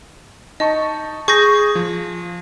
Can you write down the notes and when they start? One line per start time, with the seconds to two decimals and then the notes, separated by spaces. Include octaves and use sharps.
0.60 D#4 D#5 A5 C#6
1.28 G#4 C#6 G6 A#6
1.75 F3